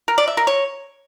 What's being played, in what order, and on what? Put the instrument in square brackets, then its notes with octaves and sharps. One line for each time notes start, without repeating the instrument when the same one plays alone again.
[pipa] A#4
D5
E5
A#4
C#5